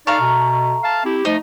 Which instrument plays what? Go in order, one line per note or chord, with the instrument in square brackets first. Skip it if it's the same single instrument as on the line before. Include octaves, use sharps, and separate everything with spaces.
[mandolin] A3 A#5 F6 [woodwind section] D#4 D5 F5
[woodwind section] B2
F5 A5
C4 E4 G4
[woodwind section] F3 A3 [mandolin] D#4